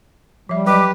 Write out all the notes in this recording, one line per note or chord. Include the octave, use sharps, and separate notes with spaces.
F3 G3 E5
F#3 G4 B4 D#5 D6